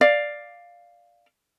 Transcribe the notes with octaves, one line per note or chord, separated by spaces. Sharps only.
D5 F5